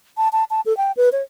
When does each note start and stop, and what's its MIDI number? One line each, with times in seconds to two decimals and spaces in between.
0.17 0.28 81
0.32 0.44 81
0.50 0.61 81
0.66 0.75 69
0.77 0.92 79
0.97 1.09 71
1.12 1.22 73